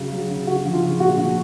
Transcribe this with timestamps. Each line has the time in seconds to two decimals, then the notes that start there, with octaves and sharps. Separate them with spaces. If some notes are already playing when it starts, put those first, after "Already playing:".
Already playing: C#3 F#3
0.12 F#3
0.29 C#3
0.47 C#3 F#4
0.65 F3
0.73 F4
0.83 C#3
1.00 A#2 F#4
1.17 F3